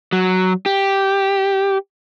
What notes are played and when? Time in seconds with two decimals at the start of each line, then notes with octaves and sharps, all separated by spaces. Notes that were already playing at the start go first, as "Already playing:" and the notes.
0.13 F#3
0.66 G4